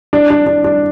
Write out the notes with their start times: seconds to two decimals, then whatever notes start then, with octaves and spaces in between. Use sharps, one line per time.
0.13 D4
0.30 D4
0.46 D4
0.64 D4